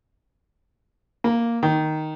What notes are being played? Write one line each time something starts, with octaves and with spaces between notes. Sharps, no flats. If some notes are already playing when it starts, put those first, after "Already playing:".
A#3
D#3